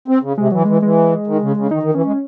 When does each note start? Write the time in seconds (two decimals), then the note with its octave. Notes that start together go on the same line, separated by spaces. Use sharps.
0.08 C4
0.22 C#3
0.37 C3 G#3
0.52 E3 F#3
0.65 E3 G#3
0.82 E3 G#3
1.27 D#3
1.42 C#3
1.57 C#3
1.71 D#3 D#4
1.83 D#3
1.94 E3 C#4
2.05 G#3